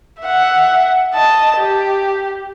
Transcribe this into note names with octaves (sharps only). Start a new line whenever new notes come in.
E5 F#5
D#5 A5
G4